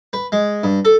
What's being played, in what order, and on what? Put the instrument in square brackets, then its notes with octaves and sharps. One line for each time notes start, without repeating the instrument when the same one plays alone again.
[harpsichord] B4
G#3
G2
A4